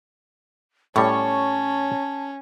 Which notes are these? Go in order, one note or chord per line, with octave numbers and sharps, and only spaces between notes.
A2 G3 C#4 C#5 A5